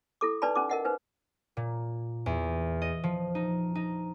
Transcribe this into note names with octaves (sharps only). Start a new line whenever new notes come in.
E4 A4 D6
D4 D#4 B4 D5 A5 B5
C#4 D#4 D6
A#4 D#5 F#5
D#4 B4 C5
A#2
E2
D#5
F3
D#4
D#4